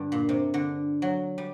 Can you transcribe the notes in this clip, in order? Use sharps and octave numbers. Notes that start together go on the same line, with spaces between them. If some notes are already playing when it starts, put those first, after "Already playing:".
Already playing: G2 D3
A#2
C3
D3
F#3
G3